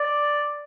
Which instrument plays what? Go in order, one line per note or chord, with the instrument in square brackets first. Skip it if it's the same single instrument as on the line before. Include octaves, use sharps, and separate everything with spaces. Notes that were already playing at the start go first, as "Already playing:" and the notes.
Already playing: [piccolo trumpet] D5